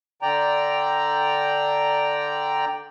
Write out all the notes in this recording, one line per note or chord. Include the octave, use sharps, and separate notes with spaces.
D3 D5 G5 A#5